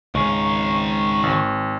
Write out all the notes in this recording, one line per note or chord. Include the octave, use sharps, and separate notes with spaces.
C#2 D#3 G#4 C#6
G#1